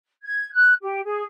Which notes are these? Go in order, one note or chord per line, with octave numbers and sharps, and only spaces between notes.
G#6
F#6
G4
G#4